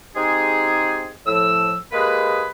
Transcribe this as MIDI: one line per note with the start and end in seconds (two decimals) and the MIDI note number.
0.15 1.11 56
0.15 1.11 60
0.15 1.11 63
0.15 1.11 67
0.15 1.11 68
1.27 1.75 45
1.27 1.75 53
1.27 1.75 88
1.92 2.46 56
1.92 2.46 58
1.92 2.46 67
1.92 2.46 68
1.92 2.46 71